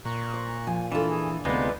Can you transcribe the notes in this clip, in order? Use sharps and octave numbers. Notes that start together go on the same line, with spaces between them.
A#2 A#5 C#6 F#6
C5
F3 G#5
E3 D4 F4 A4
G#4
D2 C3 G#3 B3 D#4 F4 B4 D5